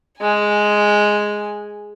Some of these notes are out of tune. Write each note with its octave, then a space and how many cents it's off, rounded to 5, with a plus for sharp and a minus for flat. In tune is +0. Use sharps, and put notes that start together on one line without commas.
G#3 +0 G#5 +0